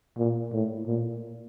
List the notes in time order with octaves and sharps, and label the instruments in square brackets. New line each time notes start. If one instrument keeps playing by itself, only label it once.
[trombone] A#2
A2
A#2